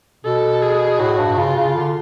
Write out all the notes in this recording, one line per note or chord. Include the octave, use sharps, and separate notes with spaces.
B2 A4
G#4
A2 F#4
G2
C#3 F4
C#3
D3